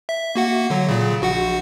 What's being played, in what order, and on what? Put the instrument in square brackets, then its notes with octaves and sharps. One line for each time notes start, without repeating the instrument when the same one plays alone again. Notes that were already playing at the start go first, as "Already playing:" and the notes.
[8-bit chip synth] E5
A#3 F#4 F#5
D3 F#3
A#2 C#3
A#1 F#4 F#5